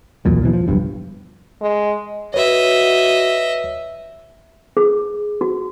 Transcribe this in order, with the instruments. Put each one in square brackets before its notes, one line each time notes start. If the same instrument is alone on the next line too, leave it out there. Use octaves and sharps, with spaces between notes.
[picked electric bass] B1 E2 A#2 F#3
F#2 B2 E3
F3
F#1 B1 G2
[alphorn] G#3
[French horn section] F#4 [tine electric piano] B4 C#5 [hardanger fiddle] D#5 E5
[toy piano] G#4
F#4